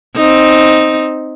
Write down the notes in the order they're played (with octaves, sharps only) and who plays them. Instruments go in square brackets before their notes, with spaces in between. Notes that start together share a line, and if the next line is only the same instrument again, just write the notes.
[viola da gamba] C4 D#4